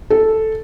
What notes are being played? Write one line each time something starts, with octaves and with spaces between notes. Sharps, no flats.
A4